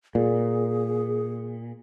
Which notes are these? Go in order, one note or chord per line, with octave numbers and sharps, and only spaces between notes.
A#2 G#4